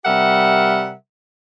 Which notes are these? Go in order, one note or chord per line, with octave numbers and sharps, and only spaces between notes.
C3 G3 G4 A#4 E5 F#5